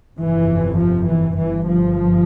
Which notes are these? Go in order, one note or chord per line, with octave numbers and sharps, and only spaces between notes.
G1 F2 C3 E3
F3
E3
G1 G2 E3
F3